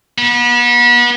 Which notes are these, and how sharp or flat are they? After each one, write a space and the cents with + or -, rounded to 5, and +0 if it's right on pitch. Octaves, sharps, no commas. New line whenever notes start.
B3 -35